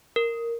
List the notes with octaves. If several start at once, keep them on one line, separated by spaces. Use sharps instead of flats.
A#4